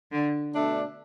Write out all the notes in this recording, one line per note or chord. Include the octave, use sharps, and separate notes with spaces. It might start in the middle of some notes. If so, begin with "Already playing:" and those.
D3
B2 A3 D4